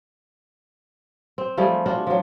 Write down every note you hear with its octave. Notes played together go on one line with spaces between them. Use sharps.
C4
F3 G3 A3 G#4
D4 F4 F#4
F3 F#3